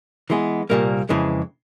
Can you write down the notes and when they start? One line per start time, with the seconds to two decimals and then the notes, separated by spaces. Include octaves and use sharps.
0.30 E3 G#3 B3
0.70 C2 A#2 G3 A#3
1.09 F2 C#3 E3 G#3